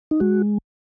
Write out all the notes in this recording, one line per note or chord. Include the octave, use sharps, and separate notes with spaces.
D#4
G#3 F#4